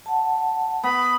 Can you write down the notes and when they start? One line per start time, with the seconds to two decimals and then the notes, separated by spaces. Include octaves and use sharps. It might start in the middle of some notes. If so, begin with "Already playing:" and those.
0.06 F#5 A5
0.83 B3 B5